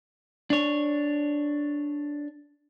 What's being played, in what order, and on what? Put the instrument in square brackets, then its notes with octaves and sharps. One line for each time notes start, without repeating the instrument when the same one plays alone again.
[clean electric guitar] D4 C#5